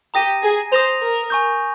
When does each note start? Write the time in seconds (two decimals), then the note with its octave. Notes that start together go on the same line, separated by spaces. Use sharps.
0.14 G4 A#5 D#6 A#6 D#7
0.43 G#4
0.72 C5 D#6 A#6 F7
1.01 A#4
1.30 G#5 C#6 G6